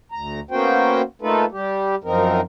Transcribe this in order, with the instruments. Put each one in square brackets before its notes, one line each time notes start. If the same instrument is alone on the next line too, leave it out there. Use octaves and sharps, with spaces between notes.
[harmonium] D2 A#5
A#3 B3 C#4 F#4 C5 G5
A3 A#3 D#4 F4 A4 B4
G3 G4
F#2 F3 C4 D#4 A#4